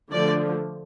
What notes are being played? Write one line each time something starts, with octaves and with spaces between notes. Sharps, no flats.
D3 F3 A3 D5